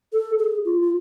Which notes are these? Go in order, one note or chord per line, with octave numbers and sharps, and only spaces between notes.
A4
G#4
F4
F4